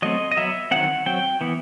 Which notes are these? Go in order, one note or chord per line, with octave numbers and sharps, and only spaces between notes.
F#3 A3 C4 D#5
D#5
F#3 B3 E5
D#3 F#3 C4 F#5
F#3 C4 G5
E3 B3